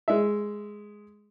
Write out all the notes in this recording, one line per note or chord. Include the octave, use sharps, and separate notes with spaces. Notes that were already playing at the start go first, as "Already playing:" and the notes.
G#3 E5